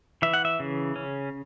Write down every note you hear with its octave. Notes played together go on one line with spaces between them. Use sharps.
E3 E5
F#5
E5
C#3
C#4